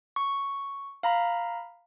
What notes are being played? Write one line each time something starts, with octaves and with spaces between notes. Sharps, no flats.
C#6
F5 A#5 B5